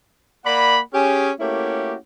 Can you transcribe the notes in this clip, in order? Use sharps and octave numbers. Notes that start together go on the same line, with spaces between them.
A#3 D5 F#5 B5
C#4 G4 G#4
A3 A#3 C#4 E4 F#4 G4